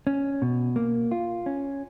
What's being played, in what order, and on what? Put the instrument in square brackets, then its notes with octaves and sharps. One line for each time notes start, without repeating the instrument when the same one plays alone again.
[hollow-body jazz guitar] C#4
B2
A#3
F4
C#4